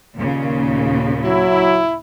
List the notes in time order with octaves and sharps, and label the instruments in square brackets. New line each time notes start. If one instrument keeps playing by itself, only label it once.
[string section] D#2 A#2 C#3
[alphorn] F#3 [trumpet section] E4